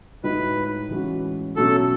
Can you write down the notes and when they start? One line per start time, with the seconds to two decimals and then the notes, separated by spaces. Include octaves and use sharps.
0.24 A2 G#3 D#4 F#4 B4
0.90 A2 E3 G#3 C#4 F#4
1.56 B2 F#3 A3 C#4 A4